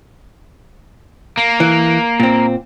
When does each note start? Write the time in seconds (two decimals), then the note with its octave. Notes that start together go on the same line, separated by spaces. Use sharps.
1.38 A#3
1.60 E3
2.20 A#2 C4